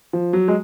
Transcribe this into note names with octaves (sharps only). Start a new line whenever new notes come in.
F3
F#3
G#3